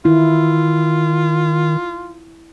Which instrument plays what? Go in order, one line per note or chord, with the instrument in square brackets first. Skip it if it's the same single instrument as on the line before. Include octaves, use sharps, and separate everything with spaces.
[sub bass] D#3 [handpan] E4 [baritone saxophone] F4